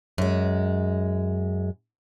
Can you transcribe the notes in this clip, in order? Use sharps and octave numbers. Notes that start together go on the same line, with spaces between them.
F#2 G#3